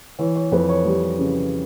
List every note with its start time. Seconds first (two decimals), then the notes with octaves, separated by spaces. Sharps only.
0.19 E3 C#5
0.36 C#5
0.52 F2 B4
0.69 C#5
0.85 G3
1.19 C#3